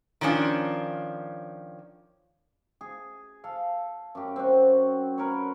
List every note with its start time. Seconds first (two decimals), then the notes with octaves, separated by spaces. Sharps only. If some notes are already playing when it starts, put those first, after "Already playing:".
0.21 D#3 F3 C#4 D4 F4
2.81 G#4
3.44 A4 F5
4.15 F#2 G4
4.36 C4 F#4
5.18 A#4 B4 C#5